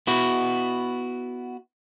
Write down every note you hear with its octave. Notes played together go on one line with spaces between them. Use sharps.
B3 E4 F#4